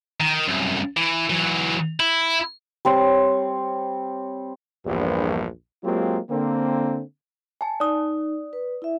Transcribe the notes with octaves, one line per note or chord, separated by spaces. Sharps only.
D#3
C2 F#2
E3
E3 F#3
E4
G3 C4 C#5 C6
A#1 E2 G2
F#3 G#3 A#3 C4 F4 G4
D3 A#3 C4
G#5 A5
D#4 D5 D#6
B4
E4 E5